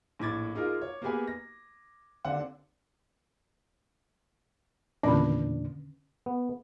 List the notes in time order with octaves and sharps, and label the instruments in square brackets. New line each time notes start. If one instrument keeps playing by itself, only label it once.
[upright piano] A#1 A2 D6 G#6 A6
G#3 D#4 F4 G#4 A#4
C#5
A#3 B3 G4 G#4 B4 G#5
A#6
D#2 D3 C4 D4 F#5
[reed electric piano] E2 A#2 D4 [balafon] D3 D#3 C#4
[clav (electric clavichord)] B3